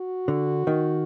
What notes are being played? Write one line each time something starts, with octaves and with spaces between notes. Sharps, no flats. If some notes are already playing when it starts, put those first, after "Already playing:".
Already playing: F#4
D3
D#3